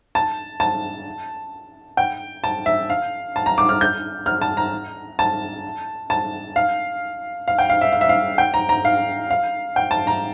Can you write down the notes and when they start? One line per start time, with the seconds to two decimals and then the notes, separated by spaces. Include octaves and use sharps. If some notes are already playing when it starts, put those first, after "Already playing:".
0.15 A5
0.60 A5
1.97 G5
2.44 A5
2.66 E5
2.90 F5
3.36 A5
3.46 A#5
3.58 D6
3.69 F6
3.81 G6
4.26 F6
4.42 A5
4.57 A#5
5.19 A5
6.10 A5
6.56 F5
7.48 F5
7.59 G5
7.70 F5
7.81 E5
7.92 F5
8.01 E5
8.09 F5
8.38 G5
8.54 A#5
8.69 A#5
8.85 F5
9.31 F5
9.76 G5
9.91 A5
10.07 A#5